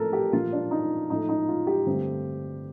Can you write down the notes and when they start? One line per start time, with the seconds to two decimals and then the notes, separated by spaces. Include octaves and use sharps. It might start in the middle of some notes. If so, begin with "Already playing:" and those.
Already playing: A2 F3 A3 C4 A4 A#4
0.13 G4
0.32 A#2 F3 A#3 F4
0.53 D4
0.71 D#4
1.10 A2 F3 A3 D#4
1.29 D#4
1.48 F4
1.67 G4
1.86 G2 D3 A3 C4